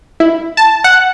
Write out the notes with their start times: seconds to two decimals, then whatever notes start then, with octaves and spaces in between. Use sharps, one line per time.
0.20 E4
0.57 A5
0.84 F#5